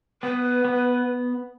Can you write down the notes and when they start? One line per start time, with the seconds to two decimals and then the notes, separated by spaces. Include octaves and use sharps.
0.23 B3 B4
0.65 B3